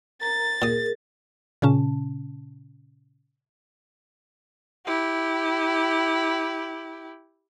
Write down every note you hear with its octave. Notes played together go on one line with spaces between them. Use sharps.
A#4 A#5 A6
A#2 G#4 A#4 D#6
A#2 C#3 C#4 A5
E4 G4